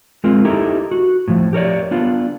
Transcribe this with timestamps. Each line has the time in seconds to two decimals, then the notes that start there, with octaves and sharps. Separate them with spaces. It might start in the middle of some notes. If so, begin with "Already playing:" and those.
0.24 G#3 C4 F4 A#4
0.45 D#4 E4 G4 A4 A#4
0.91 F#4
1.28 A2 F3
1.53 G4 A#4 C#5 D5
1.91 B3 D4 F4